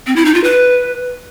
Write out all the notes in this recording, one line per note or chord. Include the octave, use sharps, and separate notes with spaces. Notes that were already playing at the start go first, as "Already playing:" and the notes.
C4
E4
D#4
F4
B4